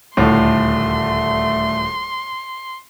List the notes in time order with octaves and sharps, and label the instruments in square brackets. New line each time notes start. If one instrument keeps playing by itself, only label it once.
[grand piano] D#1 D2 [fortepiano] A2 [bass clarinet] A3 [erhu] C6